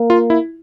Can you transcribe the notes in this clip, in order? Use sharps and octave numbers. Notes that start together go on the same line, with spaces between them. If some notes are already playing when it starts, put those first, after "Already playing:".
Already playing: A#3
F4
E4